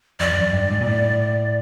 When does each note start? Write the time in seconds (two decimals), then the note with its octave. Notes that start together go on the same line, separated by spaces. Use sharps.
0.20 F2 D5
0.32 F2
0.37 F#2
0.53 G2
0.71 G#2
0.81 A#2
0.87 A2